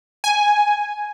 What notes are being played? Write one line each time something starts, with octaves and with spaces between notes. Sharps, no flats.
G#5